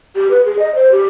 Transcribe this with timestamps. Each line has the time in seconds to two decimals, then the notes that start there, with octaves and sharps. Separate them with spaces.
0.16 G4
0.31 B4
0.45 G#4
0.59 D#5
0.75 C5
0.92 G4